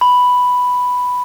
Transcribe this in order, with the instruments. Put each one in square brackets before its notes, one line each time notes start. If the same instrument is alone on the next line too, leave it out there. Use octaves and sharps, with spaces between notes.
[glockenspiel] B5